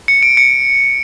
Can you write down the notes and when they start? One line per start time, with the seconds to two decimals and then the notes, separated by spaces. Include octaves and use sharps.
0.08 C#7
0.23 D7
0.37 C#7